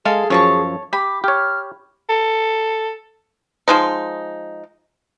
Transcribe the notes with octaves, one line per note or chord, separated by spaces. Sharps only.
G#3 G#4 A4 F5
F#2 F3 C#5 A5 C#6
G4 B5 D6
G4 C#5 F6
A4
F3 G#3 D#4